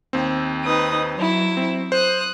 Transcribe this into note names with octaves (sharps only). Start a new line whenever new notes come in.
D#2 C4
D#4 B4 D#6
F#3 E4
C4
C5 D#6 F#6